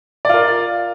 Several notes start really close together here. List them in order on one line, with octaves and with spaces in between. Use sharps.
D5 F4 A#4